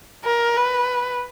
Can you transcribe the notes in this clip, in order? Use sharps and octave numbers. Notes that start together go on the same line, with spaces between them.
A#4
B4